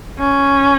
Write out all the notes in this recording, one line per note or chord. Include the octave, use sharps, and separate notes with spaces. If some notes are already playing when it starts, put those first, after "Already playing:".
C#4